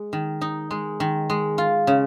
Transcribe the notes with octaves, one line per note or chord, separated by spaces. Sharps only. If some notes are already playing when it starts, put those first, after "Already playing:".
Already playing: G#3
D#3
D#4
G#3
D#3
G#3
F4
C#3